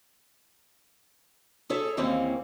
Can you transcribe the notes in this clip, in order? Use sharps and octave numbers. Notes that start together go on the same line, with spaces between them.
G#4 A4 C#5 E5
D#2 E3 A#3 C4 C#4